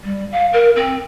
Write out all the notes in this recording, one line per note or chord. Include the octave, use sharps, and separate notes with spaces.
G3
F5
A#4
C4